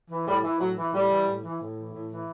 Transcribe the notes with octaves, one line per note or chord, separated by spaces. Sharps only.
E3
A2 G3
E3
A2 F#3
E3
A2 G3
E3
A2
E3
A2
E3
A2
E3